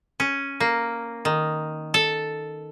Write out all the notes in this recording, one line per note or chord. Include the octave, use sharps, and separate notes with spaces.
C#4
A#3
D#3
A4